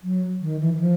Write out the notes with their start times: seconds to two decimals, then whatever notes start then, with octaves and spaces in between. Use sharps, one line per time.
0.03 F#3
0.41 D#3
0.60 E3
0.74 E3
0.80 F3